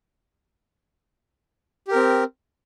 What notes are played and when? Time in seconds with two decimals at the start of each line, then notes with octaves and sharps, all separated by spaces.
1.88 G4
1.92 A#4
1.96 C4